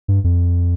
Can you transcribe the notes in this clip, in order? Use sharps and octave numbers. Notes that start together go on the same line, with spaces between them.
G2
F2